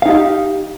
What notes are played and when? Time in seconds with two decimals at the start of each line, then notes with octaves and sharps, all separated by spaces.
0.02 F5
0.06 D#4
0.09 G4